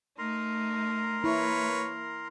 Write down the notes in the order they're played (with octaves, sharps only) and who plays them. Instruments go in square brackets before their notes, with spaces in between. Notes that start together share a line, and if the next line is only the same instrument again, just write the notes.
[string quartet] A3 D#4 [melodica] A#4 A#5 C6
[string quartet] A#3 [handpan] E4 [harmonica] B4 C#5